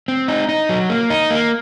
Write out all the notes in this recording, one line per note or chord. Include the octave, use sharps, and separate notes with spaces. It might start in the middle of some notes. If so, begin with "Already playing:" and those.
C4
D#4
D#4
F#3
A#3
D#4
A#3